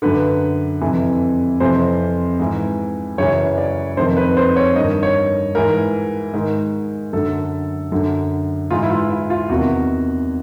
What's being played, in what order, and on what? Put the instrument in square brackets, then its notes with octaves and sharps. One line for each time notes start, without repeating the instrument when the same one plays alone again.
[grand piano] F#2 D3 B4
F2 C3 E3
F2 C3 E3 C5
G#2 E3
F#2 C#3 E3 C#5
D5
F2 C3 D#3 C5
B4
C5
C#5
G2 D#3 D#5
C#5
G#2 E3 A#4
G#2 D#3
F#2 D3 A4
F#2 D3
G#2 E3 F4
E4
F4
E4
F4
E2 C3 D#3 F#4